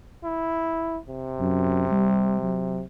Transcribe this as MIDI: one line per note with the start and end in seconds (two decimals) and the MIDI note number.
0.24 0.98 64
1.09 2.83 48
1.40 1.86 42
1.92 2.39 55
2.42 2.83 54